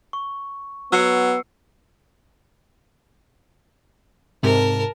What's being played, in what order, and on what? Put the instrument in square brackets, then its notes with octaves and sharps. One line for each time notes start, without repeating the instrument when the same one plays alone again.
[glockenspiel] C#6
[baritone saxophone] F#3 [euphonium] B3 [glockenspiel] E6 C7 C#7
[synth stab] G#2 C3 [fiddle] A#4 A5